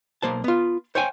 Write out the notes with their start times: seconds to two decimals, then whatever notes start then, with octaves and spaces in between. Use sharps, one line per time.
0.22 B1 A#3 C5 A5
0.44 B3 F4
0.95 C5 C#5 F5 G5 G#5